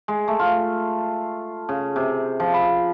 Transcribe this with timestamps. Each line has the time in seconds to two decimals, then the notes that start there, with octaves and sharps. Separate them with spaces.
0.08 G#3
0.28 A3
0.39 F4
1.69 C#3
1.96 C3
2.40 F3
2.54 B5